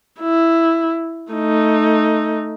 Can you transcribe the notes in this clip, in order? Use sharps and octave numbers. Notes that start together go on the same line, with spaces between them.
E4
A3 D#4